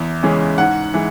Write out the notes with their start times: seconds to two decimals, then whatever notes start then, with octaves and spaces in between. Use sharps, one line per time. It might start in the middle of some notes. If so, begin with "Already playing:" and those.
Already playing: E2
0.23 C#3 E3 G#3 C#4
0.58 G#2 F#5
0.94 E3 G#3